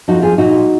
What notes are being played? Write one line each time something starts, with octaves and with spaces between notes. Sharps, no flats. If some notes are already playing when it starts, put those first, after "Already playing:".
F2 F3 D#4 F#4
F4 G#4
A#2 F3 D#4 F#4